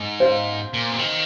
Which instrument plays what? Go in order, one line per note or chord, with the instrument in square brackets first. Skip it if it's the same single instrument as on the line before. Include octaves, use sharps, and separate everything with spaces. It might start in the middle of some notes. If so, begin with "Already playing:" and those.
Already playing: [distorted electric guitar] G#2
[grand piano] C5 F5
[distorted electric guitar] A#2
C3
D#3